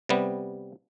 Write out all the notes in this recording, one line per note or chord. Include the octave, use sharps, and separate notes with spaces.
C3 G3 B3